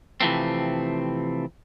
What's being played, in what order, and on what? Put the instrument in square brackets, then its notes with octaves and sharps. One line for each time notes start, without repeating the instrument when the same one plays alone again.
[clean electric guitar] C3 E3 F3 A3 C4